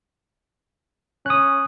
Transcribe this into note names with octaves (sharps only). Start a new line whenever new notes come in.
C#4 D#6 F#6